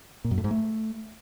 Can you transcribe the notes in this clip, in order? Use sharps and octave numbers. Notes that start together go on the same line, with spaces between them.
A#2
F#2
A2
G#2
A3